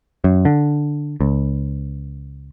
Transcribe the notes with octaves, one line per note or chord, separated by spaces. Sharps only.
F#2
D3
C#2